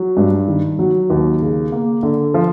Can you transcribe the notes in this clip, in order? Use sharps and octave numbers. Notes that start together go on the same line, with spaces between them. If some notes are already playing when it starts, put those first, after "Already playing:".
Already playing: F#3
G2
D#3
F#3
D#2
C#3
A#3
D3
F3